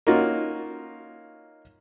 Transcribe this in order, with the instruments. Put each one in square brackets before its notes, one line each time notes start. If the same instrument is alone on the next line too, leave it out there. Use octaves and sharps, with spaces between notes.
[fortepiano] A#3 C#4 D#4 F4 F#4